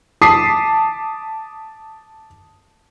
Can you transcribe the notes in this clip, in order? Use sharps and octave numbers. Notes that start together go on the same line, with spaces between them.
A5 D6 D#6 B6 C7